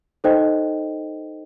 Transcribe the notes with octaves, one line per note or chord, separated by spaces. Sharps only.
D#4 A4 C5 D#5 G5